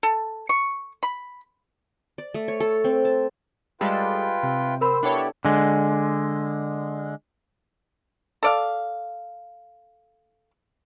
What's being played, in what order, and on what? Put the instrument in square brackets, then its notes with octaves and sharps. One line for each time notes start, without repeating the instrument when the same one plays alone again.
[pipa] A4
C#6
B5
[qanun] D5
A3
C#5
A4
C4
A5
[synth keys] G3 G#3 A4 [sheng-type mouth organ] F4 B4 G5
[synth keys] C3
[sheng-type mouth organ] C4 C5 E6 [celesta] A#4 B5
[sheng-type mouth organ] B3 E4 G4 [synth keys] D4 A4 C#5
[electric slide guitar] D3 G#3
[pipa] A4 D5 F5